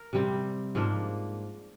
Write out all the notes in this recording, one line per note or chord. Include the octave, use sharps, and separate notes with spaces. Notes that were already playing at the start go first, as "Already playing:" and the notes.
Already playing: A#4
C3 G3 C4
G#2 F3 A#3 D4